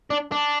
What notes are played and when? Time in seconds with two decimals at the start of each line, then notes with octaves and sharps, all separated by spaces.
0.10 D4
0.32 D4